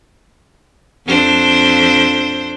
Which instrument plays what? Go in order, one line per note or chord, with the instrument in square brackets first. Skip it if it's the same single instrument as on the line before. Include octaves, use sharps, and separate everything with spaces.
[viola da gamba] F2 D4 C5